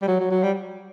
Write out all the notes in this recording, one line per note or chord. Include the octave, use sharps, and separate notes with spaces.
G3
F#3
F#3
F#3
G3